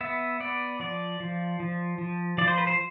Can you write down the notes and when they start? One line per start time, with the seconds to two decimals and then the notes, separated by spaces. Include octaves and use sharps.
0.01 B3 E5
0.40 B3 D5
0.80 F3 D5
1.20 F3
1.60 F3
1.98 F3
2.38 F3 D5
2.48 C5
2.58 B4
2.67 C5